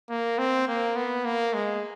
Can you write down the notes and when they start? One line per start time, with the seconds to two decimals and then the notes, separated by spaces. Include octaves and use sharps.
0.10 A#3
0.38 C4
0.67 A#3
0.96 B3
1.25 A#3
1.53 G#3